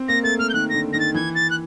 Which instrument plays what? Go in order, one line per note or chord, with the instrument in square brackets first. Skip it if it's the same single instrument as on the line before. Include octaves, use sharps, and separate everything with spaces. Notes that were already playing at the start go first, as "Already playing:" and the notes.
Already playing: [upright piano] C4
[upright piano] A#3 [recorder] A#6
[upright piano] A3 [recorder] A6
[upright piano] A3 [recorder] F6
[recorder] G6
[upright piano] D#3 [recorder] F#6
[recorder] A#6
[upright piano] D3
[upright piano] D#3 [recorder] A#6
[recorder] A6
[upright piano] E3 [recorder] G#6
[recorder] A6
F#6